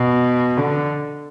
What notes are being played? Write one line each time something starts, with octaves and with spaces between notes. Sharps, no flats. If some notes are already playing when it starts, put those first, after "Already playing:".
Already playing: B2
D3